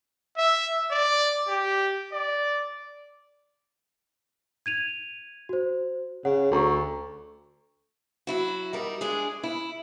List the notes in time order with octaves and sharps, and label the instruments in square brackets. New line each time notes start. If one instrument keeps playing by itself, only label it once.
[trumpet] E5
D5
G4
D5
[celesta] G#6 D#7 F7
F#4 C5
[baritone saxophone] C#3 [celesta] C#5 F#5
[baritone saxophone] D2 [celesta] A4 A#5 C#6
[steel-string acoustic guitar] F#3 E4 F#4
G3 D#4 A#4
G#3 D4 G#4
E4